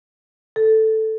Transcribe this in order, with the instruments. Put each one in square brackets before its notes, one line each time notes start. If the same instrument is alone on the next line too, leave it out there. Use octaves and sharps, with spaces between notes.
[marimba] A4